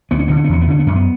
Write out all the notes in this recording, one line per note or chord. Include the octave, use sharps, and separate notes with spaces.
D2 B3
C#4
D3 B3
C#4
B3
E2 C#4
B3
D3 C#4
B3
F#2 C#4
B3